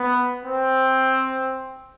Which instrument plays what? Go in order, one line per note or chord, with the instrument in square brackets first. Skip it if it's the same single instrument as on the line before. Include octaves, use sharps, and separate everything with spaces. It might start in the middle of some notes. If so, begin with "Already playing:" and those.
Already playing: [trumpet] B3
C4